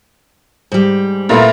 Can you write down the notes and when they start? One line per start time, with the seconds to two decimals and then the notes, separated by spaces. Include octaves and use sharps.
0.72 G#2 G3
1.29 A#2 A3 B3 E4 F4 A#4